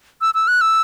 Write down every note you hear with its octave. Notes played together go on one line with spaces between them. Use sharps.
E6
E6
F#6
E6